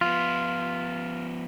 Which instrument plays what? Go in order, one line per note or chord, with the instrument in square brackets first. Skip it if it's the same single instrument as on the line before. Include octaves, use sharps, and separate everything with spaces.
[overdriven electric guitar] F3 B3 [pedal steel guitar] F4